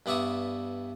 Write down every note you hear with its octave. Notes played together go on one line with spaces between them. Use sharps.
G2 B3 D5 E5 C#6 D#6